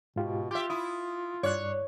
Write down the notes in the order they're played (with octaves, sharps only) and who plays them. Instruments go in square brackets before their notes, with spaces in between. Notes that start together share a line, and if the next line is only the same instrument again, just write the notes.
[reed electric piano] G#2 F4 G4 [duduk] B2
[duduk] F4 [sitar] G4 E5 [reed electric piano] D6
[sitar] E4 [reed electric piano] D#6
[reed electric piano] G2 D5 F#6 [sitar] C#5